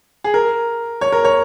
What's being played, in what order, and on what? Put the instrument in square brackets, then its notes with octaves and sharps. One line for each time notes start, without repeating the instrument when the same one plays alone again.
[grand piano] G#4
A#4
C#5
A#4
C#5